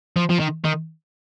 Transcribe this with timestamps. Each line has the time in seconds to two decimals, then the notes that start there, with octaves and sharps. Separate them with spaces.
0.16 F3
0.29 F3
0.39 D#3
0.64 D#3